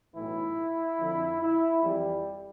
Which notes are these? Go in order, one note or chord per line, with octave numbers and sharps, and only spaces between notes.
B1 A2 E3 E4
F2 D3 F3
E4
F2 E3 G3